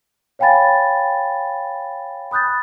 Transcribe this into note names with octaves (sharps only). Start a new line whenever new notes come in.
C#5 F5 G5 G#5 B5 A6
B5 D#6 F#6 G6 A6